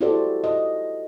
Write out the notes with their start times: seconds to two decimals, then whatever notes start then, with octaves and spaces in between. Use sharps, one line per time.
0.01 E4 F#4 G4 A4 C5 D5
0.44 D#5